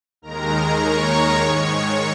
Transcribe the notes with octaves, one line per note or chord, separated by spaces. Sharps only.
D#2 D#3 G#3 A#4 A#5
C#5 C#6
G#2 D#3 G#3